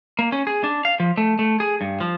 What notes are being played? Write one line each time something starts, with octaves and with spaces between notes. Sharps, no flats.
A#3
C#4
G#4
D4
F5
F3
A3
A3
G#4
G2
F3